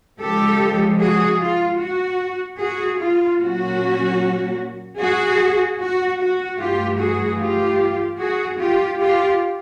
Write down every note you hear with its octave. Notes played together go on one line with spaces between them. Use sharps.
C#3 F3 G#3 G4 A4
F#4 G#4
F4
F#4
F#4 G#4
F4
A#2 F#3 A#3 C#4 F#4
F#4 G#4
F#4
F#4
G2 E3 A3 F4 G4
F#4 G#4
F4 G4
F#4 G#4
F4 G4
F4 G4